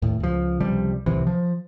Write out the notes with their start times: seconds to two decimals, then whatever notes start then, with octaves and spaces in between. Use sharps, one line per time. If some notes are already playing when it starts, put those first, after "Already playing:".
0.02 D#2 A2
0.20 C#2 F3
0.60 C#2 C3 F3 G3
1.06 D1 C2 C3 E3
1.27 F3